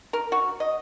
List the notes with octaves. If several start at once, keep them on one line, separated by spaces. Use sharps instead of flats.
A#4
F#4
D#5